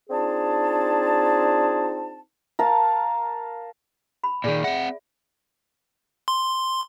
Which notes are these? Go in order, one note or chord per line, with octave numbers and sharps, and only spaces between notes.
C4 D4 D#4 F4 G#4 A5
A#4 F5 A5
B5
A#2 D#3 G#4 D5
C4 E5 F#5
C6